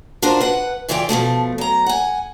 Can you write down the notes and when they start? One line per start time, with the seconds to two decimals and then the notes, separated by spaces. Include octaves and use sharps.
0.22 D4 F4 F#4 A#4 C5
0.41 B4 F#5
0.89 C#3 E3 F4 D5 F#5 G5
1.09 B2 E3 F3 A3
1.58 F#3 A#5
1.86 F#5 G#5